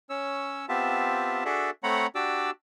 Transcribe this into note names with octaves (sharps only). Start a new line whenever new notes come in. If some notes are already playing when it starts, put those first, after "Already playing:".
C#4 C#5 E6
B3 C4 F4 G4 E5 A5
D4 F#4 G#4 A4 D5 E5
A3 C4 C#5 F#5 A#5 B5
D4 F#4 G4 D5 D6 E6